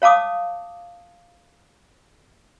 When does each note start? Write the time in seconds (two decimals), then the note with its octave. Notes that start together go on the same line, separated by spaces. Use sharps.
0.02 C#5 F5 A5 D6 D#6